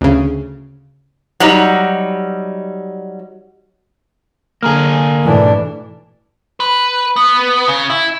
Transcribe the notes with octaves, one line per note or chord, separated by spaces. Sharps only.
D2 C#3
F#3 G3 D#4
D3 A#3 G#4 A#5 F6
G#2 B2 E3 A3 D4
B4
B3
C#3
E4